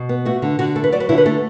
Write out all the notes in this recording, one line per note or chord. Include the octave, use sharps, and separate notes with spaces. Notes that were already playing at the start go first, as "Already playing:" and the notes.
Already playing: B2
B3
A3 F#4
D3
D3 F#4
A3 A4
B4
F#3 D5
B4
D3 E4
B4
A3 A4